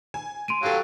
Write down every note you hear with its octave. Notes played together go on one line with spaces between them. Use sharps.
G#5
C6 D7 D#7
F#3 G4 A4 F5